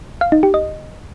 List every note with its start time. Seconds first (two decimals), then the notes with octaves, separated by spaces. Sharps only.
0.21 F5
0.32 D#4
0.43 G4
0.54 D#5